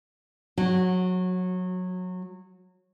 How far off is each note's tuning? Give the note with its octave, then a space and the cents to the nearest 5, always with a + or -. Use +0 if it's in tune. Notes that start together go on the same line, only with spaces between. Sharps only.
F#3 -20 F#4 +0